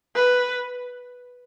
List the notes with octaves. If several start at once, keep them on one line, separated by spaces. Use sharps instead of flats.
B4